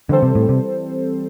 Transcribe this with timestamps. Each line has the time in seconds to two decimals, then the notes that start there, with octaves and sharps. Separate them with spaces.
0.09 D3 E3 G3 C4 A4 C5
0.23 C3
0.35 A2
0.49 C3